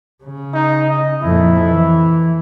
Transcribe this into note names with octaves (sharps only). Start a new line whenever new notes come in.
C#3
D#4
D#5
F2 A#2 E4
E3